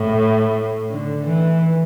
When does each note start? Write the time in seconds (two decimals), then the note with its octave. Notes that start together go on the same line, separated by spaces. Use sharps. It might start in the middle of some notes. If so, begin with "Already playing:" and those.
Already playing: A2
0.90 D3
1.26 E3